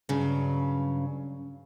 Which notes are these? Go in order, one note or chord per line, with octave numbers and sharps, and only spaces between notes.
G2 C#3 F#3